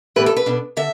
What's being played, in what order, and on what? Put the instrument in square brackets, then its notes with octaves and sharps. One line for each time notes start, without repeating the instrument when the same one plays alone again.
[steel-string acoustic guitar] A2 E3 G3 B3 B4
A4
B4
B2 B3 D4
D3 E5